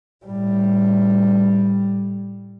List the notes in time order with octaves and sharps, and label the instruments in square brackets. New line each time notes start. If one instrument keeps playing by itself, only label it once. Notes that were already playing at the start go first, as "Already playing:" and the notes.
[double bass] A2 G3